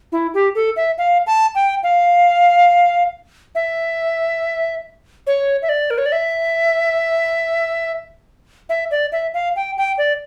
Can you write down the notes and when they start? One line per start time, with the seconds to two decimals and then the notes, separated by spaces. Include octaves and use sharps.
0.12 E4
0.34 G4
0.55 A4
0.76 E5
0.98 F5
1.27 A5
1.55 G5
1.83 F5
3.55 E5
5.27 C#5
5.62 E5
5.69 D5
5.90 A#4
5.98 C#5
6.06 D5
6.12 E5
8.69 E5
8.91 D5
9.12 E5
9.34 F5
9.56 G5
9.78 G5
9.98 D5